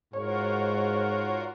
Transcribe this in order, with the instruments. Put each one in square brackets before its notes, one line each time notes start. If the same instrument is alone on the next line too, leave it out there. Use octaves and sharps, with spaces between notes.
[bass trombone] G#2 [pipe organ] F4 F#4 A#4 [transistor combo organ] C#5